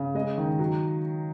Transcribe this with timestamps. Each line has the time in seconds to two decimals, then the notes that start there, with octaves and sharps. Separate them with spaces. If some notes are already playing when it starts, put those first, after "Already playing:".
Already playing: C#3
0.15 G#3 D#5
0.38 D#3
0.59 F#3